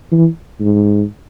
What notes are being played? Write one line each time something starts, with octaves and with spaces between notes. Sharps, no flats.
E3
G#2